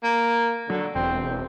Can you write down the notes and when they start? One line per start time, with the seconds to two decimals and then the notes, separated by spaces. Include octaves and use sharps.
0.03 A#3
0.70 D3 F#3
0.95 E1 C4